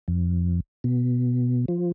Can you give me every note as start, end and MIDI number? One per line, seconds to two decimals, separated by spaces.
0.08 0.60 41
0.84 1.66 47
1.68 1.92 53